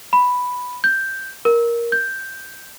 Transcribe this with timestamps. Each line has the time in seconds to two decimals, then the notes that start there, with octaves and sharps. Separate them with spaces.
0.13 B5
0.84 G6
1.45 A#4
1.92 G6